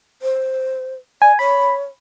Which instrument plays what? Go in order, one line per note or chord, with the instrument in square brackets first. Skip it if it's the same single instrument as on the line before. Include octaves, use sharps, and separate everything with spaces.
[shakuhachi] C5
[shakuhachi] D5 [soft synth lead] G#5
[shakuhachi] C#5 [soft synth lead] B5